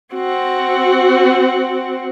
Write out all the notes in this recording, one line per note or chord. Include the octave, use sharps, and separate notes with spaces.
C4 F#4